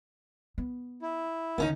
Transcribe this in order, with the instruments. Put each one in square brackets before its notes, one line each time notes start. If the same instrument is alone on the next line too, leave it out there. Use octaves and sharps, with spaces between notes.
[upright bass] B3
[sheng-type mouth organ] E4
[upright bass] D2 D#3 [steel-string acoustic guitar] B3 C#4 D#4